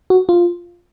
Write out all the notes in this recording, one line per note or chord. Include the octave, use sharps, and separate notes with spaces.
F#4
F4